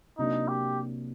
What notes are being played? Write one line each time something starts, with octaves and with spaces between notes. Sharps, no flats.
C3 F#3 A#3 D4 D#4
G4